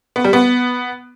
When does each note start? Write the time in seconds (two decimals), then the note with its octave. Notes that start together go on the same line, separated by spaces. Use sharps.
0.16 B3
0.24 G3
0.33 B3